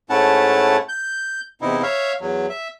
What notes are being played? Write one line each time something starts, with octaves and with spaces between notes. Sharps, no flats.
G#2 A3 C#4 E4 F#5 A5
G6
E2 C3 D#4 E4
C#5 E5 F5
E2 F#3
E5